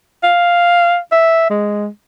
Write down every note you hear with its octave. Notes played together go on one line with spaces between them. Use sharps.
F5
E5
G#3